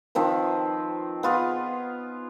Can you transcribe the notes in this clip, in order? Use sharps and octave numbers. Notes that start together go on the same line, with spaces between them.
D#3 F3 C4 B4
B3 F4 G#4